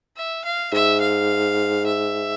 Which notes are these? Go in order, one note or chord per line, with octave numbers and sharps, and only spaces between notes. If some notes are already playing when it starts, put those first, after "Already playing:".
E5
F5
G#2 E5
F5
E5